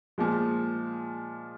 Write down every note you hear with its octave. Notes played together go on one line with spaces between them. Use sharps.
A#2 F3 G#3